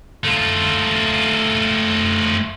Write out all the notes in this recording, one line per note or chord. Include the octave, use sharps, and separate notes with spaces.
A3 F4